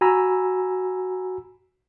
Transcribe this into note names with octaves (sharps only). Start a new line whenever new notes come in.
F#4 G#5 A#5 B5 E6